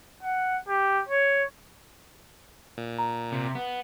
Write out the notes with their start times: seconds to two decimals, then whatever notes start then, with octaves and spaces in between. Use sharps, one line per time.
0.23 F#5
0.68 G4
1.09 C#5
2.78 A#2
2.98 A#5
3.32 C3
3.55 B3